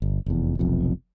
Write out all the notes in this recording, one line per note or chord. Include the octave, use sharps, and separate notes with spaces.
G1
F1 E2
F1 B1 F2